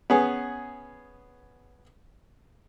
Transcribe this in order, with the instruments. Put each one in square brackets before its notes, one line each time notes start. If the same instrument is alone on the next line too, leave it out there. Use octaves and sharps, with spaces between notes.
[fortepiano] B3 C#4 G#4